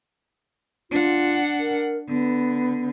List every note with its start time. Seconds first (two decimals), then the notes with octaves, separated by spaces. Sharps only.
0.91 D4 F4 F#5
1.59 A#4
2.09 D3 B3